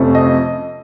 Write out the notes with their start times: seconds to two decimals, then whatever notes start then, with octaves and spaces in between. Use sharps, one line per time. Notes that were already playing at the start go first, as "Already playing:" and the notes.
Already playing: F2 C3 F3 A3 C#4
0.15 D#5